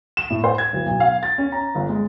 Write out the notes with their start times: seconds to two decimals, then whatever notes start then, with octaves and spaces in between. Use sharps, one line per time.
0.17 E7
0.30 A2
0.44 C5
0.58 G#6
0.73 D1
0.86 B1
1.00 F5
1.23 A6
1.38 C#4
1.52 A#5
1.75 G1
1.89 G#3